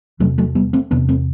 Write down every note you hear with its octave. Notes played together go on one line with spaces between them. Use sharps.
E2 C3 F#3 A3
F#3 A3
G3 B3
A3 C4
E2 C3 B3 D4
A3 C4